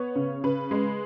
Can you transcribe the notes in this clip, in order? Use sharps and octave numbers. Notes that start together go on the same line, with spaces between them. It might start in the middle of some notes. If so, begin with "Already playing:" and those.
Already playing: B3 C#5
C#3
C#3 B4
G#3